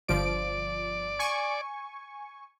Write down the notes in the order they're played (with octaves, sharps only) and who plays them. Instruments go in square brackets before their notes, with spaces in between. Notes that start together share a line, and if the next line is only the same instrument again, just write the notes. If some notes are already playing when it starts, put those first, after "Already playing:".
[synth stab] G1 F3 D7 [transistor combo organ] D5
[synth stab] G#5 C#6